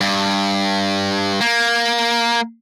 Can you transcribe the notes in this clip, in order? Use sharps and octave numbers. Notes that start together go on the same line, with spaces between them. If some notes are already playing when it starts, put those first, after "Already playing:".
G2
A#3